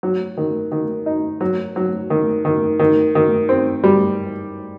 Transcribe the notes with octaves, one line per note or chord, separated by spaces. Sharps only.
F#3
D#3
D#3
D#4
F#3
F#3
D#3
D#3
D#3
D#3
C4
G3